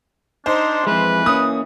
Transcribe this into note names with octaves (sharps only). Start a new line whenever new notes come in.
D4 D#4 C5
F2 E3 G#3 B4
A#3 C#4 D#6